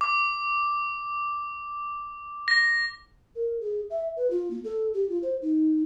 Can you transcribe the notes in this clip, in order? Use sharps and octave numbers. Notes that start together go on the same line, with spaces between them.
D6
A#6
A#4
G#4
E5
B4
F4
A#3
A4
G4
F4
C5
D#4